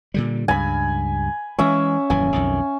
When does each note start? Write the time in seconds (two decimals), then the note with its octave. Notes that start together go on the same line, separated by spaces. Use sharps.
0.14 A#2 D3 G3
0.48 C#2 G2 G#5 B5
1.59 E3 G#3 C#4 E5
2.10 D#1 F#2 E3 G#5
2.32 B1 F2 D#3